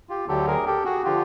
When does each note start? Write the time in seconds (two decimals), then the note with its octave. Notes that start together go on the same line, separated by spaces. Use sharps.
0.09 F4 G4
0.28 D2 D3 F#3 G4 A4
0.48 G#4 A#4
0.67 G4 A4
0.85 F#4 G#4
1.05 D3 F3 F4 G4